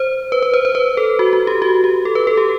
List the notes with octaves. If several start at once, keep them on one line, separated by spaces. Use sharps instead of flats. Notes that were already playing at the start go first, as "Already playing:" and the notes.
Already playing: C5
B4
B4
C5
C5
B4
A4
F#4
F#4
G4
F#4
G4
A4
B4
A4
G4